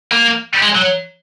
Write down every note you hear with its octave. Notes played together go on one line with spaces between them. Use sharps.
A#3
G#3
F#3